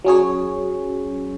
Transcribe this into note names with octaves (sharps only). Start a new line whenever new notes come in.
F#3 C#4 G#4 C#5